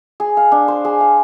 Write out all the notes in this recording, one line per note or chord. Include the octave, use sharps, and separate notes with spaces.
G#4
F5
D4
C5
G#4
F5